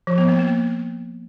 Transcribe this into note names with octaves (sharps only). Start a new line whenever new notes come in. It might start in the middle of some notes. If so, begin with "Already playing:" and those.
F3
B3
A#3
A#3